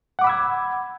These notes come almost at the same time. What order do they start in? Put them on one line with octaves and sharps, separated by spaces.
F#5 D6 B5 E6 G#6